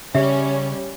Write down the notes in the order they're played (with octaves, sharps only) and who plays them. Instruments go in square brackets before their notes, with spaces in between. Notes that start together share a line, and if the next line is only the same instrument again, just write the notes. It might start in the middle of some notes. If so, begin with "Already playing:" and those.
[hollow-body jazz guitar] C#3 [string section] G3 C#4 [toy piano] G4 E5